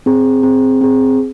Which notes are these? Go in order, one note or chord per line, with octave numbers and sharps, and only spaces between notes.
C4 G#4
C4 G#4
C4 G#4